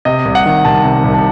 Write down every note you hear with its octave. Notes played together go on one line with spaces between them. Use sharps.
C3 D#5
C2
F#5
D#3
C2 A5
C3
C2
A5